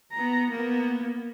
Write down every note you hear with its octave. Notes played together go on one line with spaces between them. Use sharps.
B3 A#5
A#3 B3